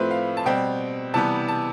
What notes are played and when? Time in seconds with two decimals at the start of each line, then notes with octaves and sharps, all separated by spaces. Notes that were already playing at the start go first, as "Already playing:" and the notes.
Already playing: A2 F3 A3 C4 B4 C5 E5
0.11 F5
0.37 A5
0.45 B2 G3 C4 G5
1.14 C3 E3 G3 B3 A5
1.48 A5